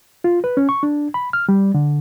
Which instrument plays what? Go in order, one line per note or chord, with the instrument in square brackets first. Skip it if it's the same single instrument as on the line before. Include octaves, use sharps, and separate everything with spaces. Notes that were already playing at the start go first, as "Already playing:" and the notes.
[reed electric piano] F4
B4
C#4
C#6
D4
B5
F6
G3
D3